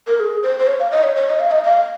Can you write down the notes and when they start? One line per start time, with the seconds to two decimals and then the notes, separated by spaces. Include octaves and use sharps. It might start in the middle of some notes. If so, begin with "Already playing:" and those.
0.08 A#4
0.20 G#4
0.43 C5
0.59 C5
0.67 C#5
0.80 F5
0.91 D#5
1.03 C#5
1.16 C#5
1.28 D#5
1.40 F5
1.51 D#5
1.64 F5